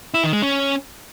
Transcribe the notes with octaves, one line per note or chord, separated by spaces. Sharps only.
E4
D#3
G#3
C#4